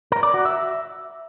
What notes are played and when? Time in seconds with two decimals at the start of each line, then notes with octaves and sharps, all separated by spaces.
0.12 A#4
0.23 D5
0.34 F#4
0.45 E5